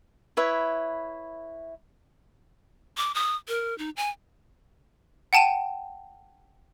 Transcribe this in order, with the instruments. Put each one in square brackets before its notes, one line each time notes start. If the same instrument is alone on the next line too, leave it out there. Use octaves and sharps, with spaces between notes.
[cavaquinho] E4 B4 C#5 E5
[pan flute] D6
D#6
A#4
D#4
G#5
[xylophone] F#5 G5 A5 D#7 E7